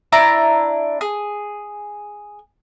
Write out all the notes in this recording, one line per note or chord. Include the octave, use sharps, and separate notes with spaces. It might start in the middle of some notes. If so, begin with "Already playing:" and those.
D4 E4 A#5
G#4